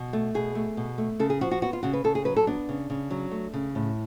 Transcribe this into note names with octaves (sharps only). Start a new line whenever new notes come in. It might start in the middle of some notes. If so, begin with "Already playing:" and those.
Already playing: B2
A3
B2 G#4
A3
B2
A3
C#3 A4
G#4
F3 F#4
F#4
B3 F#4
F4
C#3 F#4
B4
C#3 A4
G#4
F#3 B4
A4
B3 D4
C#3
C#3
F#3
A3
C#3
A2